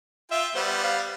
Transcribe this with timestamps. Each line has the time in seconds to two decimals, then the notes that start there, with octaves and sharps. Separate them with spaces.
0.31 F4 E5 G5
0.55 G3 B3 C5
0.84 F5